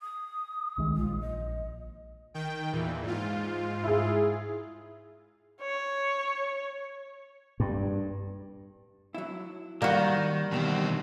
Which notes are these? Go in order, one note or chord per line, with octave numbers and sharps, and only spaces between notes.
D#6
C2 D#3 G#3
A#1 F4
D#5
D#3 G5
E2 A#2 E3
G#2 F4
E4 G#4
C#5
G2
F#3 E4
D#3 G3 A#3 F#4
E2 G2 B2 D#3 C4